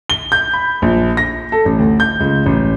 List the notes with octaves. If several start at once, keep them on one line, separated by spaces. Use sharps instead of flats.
G7
G6
B5
A#1
A#6
A4
A1
D2
G6
C#2
A1